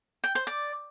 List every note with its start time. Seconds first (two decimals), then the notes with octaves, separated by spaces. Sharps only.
0.24 G5
0.35 C5
0.47 D5